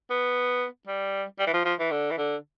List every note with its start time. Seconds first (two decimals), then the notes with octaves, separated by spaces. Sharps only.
0.10 B3
0.87 G3
1.39 G3
1.47 E3
1.53 F3
1.65 F3
1.79 E3
1.91 D3
2.11 E3
2.18 D3